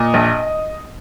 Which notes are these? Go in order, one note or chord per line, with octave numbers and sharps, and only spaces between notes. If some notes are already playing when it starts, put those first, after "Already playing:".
Already playing: A#2 D#5
A#1